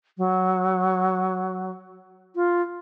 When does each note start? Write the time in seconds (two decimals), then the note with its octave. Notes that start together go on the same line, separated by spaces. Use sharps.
0.18 F#3
2.36 F4